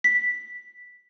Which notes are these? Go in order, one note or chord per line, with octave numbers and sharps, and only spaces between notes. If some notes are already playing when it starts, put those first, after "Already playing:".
B6